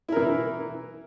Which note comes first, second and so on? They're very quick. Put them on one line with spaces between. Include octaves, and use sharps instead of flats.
E4 A#4 E3